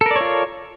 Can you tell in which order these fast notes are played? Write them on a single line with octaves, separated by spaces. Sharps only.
A4 A#4 D5 C#5 F4